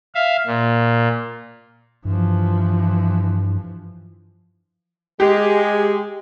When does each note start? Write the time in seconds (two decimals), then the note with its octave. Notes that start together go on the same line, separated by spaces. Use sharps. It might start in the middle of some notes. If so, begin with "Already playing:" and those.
0.15 E5 F5
0.47 A#2
2.05 G2 E3 F3
5.20 G#3 G4